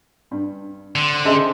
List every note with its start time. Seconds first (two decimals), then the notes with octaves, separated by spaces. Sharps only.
0.31 G2
0.95 D3 C4
1.25 C#4 G#4 C5 D#5 E5 G#5